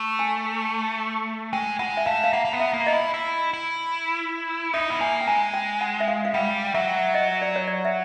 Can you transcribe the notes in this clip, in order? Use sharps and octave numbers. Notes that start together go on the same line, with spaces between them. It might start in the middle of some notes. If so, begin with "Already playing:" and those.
Already playing: A3
G#5
G#3 G5
G#3 F#5
E5
A3 F5
F5
A#3 F#5
A#3
B3
E5
A#3
D#4 D#5
E4
E4
E4
D#4 E5
B3
A#3 G#5
G5
G#3 G#5
G5
F#5
E5
F5
F5
G3 F#5
F#3 E5
D#5
D5
C#5
D5
E5